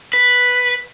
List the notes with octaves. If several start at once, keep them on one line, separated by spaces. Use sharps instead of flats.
B4